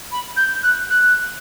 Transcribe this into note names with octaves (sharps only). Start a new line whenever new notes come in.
B5
G6
F#6
F#6